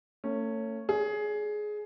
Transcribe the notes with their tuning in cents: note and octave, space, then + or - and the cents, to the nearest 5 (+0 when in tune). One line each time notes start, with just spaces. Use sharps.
A3 +40 C#4 +0
G#4 +15 D5 -45